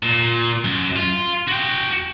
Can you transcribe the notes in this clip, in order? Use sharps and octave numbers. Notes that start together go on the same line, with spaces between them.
A#2
F#2
F4
F#4 G5